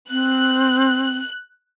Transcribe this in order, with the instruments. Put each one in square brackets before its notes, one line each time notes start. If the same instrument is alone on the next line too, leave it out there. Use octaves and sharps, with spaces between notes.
[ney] C4 [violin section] F#6